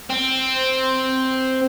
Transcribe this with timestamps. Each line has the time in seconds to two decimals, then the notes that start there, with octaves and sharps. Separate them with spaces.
0.10 C4